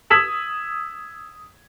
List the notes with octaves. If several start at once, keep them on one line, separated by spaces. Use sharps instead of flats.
D#6 E6 G#6 B6 E7 F#7